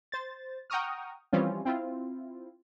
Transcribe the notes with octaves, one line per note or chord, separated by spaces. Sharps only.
C5 A6
F#5 G5 A#5 C#6 D#6 F6
E3 F3 G3 C4 C#4 F4
C4 E4 F4